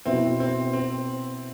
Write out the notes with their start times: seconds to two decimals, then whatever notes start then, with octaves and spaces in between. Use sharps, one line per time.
0.05 B2 B3 C4 E4
0.40 C4
0.73 C4